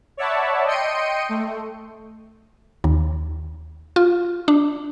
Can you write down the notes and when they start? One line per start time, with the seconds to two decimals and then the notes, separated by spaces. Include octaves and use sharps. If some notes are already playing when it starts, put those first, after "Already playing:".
0.17 C#5 D5 E5 F#5 A5 B5
0.66 D#5 G5 C6 C#7 D#7
1.29 A3
2.84 D#2
3.96 F4
4.48 D4